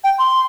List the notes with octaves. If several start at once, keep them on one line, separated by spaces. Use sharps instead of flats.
G5
C6